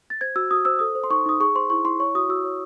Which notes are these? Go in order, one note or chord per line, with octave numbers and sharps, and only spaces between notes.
A6
C5 G#6
F#4 E6
F#4 D#6
C5 E6
A4 D#6
C5
C6
D#4 C#6
D#4 D#6
G#4 C#6
C5 C6
E4 C#6
E4 C6
C#5 C#6
F#4 D#6
F#4 E6
C#5